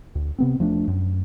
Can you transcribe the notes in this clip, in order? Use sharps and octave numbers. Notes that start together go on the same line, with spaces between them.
D2
C3 B3 C4
E1 F3 A3 D4
F#2